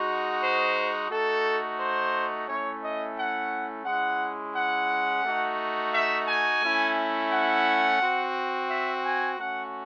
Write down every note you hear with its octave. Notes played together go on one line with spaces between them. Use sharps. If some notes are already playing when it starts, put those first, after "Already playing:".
Already playing: G#3 D#4 F#4
C5
A3 D#4 F#4 A4
C5
A3 C#4 E4 C#5
D#5
F#5
G#3 C#4 E4 F#5
F#5
A3 D#4 F#4
E5
G#5
A3 C#4 E4
F#5
C4 F#4
E5
G#5
A3 C#4 F#4 F#5